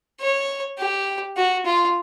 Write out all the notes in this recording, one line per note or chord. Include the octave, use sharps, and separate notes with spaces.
C#5
G4
F#4
F4